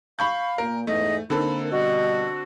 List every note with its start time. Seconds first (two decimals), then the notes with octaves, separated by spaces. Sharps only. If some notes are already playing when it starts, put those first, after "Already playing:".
0.19 F5 B5 C#6 G6
0.58 A#2 A#4
0.87 E2 G#2 A3 D#5
1.30 D3 A#3 C4 D#4 A4 A#4 B5
1.71 B2 G3 F#4 D#5